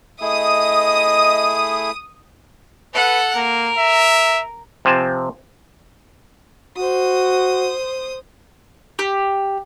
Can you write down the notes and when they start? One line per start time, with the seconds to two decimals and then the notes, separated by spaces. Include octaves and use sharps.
0.21 A3 E4 G#4 D#5 D#6
2.94 A4 B4 F#5
3.35 A#3 A#4
3.78 E5
4.85 C3 F3 C4 G#5 A5
6.77 F#4 C5 D#6
8.99 G4